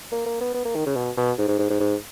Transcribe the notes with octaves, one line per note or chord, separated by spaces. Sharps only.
A#3
A#3
B3
B3
A#3
D#3
C#3
B2
B2
G#2
G#2
G#2
G#2
G#2